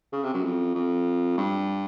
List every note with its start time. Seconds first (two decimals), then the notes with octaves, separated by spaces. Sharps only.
0.12 C#3
0.24 C3
0.34 F#2
0.44 F2
0.75 F2
1.38 G2